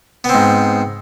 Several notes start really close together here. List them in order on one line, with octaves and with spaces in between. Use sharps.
B3 C4 G#2